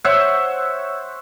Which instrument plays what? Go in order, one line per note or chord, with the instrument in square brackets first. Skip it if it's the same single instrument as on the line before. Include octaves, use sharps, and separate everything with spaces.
[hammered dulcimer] C5 C#5 E5 F#5